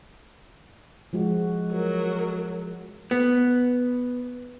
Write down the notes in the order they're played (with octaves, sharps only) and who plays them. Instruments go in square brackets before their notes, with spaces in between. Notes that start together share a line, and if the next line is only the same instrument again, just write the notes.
[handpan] F3 G#3 F#4
[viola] F#3 A#4
[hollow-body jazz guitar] B3